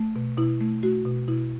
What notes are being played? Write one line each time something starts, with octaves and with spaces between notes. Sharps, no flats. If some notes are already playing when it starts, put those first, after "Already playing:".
Already playing: A3
B2
B2 E4
A3
A3 F#4
B2
B2 E4